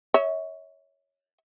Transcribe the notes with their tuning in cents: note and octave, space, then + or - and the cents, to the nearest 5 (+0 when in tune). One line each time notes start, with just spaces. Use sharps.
C#5 +10 E5 -40